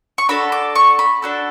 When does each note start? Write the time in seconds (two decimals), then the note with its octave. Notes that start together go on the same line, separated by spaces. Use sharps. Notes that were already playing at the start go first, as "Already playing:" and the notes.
0.18 C#6
0.29 D4 F#4 A4 B5
0.52 D6
0.75 C#6
0.99 B5
1.22 D4 F#4 A4